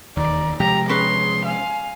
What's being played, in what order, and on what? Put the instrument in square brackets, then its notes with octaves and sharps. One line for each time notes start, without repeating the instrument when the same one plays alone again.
[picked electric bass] E1 D#2 D#3 [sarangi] D5 [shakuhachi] A#5
[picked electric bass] C3 F3 G#3 [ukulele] G4 [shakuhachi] G5 [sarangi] A#5
[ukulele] C#4 B4 [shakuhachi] G#4 [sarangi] C6
[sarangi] F5 [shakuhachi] G#5